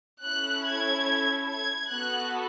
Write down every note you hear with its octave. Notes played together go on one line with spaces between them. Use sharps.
C#4 E4 A4 F#6
G#6
G#6
B3 F#4 A4 F#6